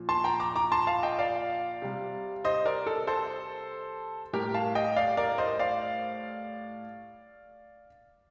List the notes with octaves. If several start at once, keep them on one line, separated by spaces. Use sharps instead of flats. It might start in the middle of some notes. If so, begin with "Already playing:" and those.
Already playing: A#2 F3
A5 C6
G5 A#5
A#5 D6
A#5 D6
A5 C6
F5 A5
D#5 G5
D5 F5
C3 G3
C5 D#5
A#4 D5
A4
A4 C5
A2 G3 G4 A#4
F5 A5
D#5 G5
D5 F5
A#4 D5
C5 D#5
D5 F5